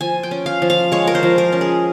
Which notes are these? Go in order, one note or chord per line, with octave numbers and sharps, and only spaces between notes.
F3 G#5
G5
C#4
F5
F3
F5
G#3 C#5
A#4
C5
F3
A#4
C#4
G#4